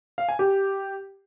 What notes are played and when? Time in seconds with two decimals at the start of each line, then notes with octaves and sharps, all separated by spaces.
0.18 F5
0.29 G#5
0.39 G4